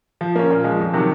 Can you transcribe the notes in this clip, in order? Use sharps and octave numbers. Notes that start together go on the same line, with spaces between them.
F3
A#3 C#4
A#2
F3 G#3
F2
C3 D#3 F#3